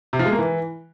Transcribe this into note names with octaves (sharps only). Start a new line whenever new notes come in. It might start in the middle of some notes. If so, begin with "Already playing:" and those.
C3
F3
G#3
A#3
E3